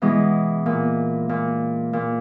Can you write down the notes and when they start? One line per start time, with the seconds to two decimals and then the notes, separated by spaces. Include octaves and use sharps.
0.02 B2 E3 G#3
0.66 A#2
1.29 A#2
1.93 A#2